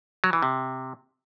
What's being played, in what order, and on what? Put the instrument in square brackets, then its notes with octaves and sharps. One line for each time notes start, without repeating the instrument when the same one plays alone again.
[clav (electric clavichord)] F#3
E3
C3